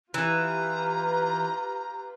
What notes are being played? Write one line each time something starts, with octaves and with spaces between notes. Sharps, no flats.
E3 F4 G4 B4 A#5